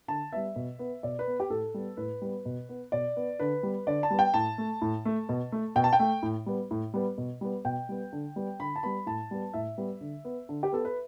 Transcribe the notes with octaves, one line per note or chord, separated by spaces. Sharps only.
D3 A5
G3 B3 E5
B2
B3
B2 D5
B4
B3
G4
A2 A4
G3 B3
A2 B4
G3 B3
B2
B3
B2 D5
B3
D3 B4
G3 B3
D3 D5
A5
G3 B3
G5
A2 A5
A3
A2
A3
B2
A3
B2 G5
A5
G5
A3
A2
G3 B3
A2
G3 B3
B2
G3 B3
B2 G5
G3 B3
D3
G3 B3
D3 B5
A5
G3 B3 B5
A2 A5
G3 B3
A2 E5
G3 B3
D3
B3
D3
G4
B3 A4
B4